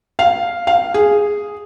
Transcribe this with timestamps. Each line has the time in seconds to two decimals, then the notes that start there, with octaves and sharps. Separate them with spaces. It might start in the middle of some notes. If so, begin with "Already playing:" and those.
0.19 F5
0.67 F5
0.94 G#4